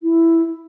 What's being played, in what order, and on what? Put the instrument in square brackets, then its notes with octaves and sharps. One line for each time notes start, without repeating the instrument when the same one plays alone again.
[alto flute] E4